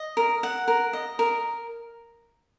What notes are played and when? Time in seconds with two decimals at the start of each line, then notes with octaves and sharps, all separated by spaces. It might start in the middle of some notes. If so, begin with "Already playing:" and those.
Already playing: D#5
0.17 A#4
0.43 F#5
0.68 A#4
0.93 D#5
1.19 A#4